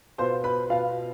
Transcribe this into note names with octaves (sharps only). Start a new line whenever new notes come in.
B2 B3 F4 C5 C6
B4 B5
B2 B3 F4 F5